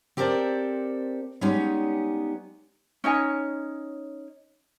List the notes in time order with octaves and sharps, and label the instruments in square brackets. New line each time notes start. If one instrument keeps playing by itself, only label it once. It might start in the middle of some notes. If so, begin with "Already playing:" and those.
[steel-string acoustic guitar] C4 G4 A4 A#4 C5 D5
G3 G#3 B3 C#4 D#4 G4
[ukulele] C#4 D#4 C#5 G#5